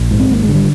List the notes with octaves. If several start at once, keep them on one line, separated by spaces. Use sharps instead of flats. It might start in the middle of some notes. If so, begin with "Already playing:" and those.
Already playing: A#1
G#2
C4
G#1 A#3
G#3
D3
G3